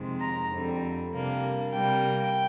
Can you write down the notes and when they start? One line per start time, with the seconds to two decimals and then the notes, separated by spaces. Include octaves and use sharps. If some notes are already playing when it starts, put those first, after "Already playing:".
Already playing: F2 C3 D#3 G#3 C4
0.20 A#5
0.51 F2 D3 G3 C4
1.12 C3 G3 A#3 D4
1.72 C3 G3 A#3 G5